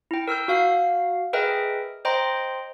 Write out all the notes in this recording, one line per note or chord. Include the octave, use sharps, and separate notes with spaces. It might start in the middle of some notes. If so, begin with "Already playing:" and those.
E4 G5
A#4 E6 F6 G6
F#4 F5 C7
G#4 A#4 B4 D#5 E5 G5
C5 D#5 G5 A#5 C6